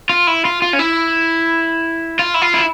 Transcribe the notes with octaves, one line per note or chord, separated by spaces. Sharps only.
F4
E4
F4
F4
C#4
E4
F4
E4
F4
E4